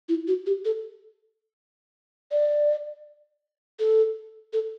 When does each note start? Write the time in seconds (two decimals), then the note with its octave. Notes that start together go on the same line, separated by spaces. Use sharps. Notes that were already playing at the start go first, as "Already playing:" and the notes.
0.09 E4
0.28 F#4
0.46 G4
0.65 A4
2.31 D5
3.79 A4
4.53 A4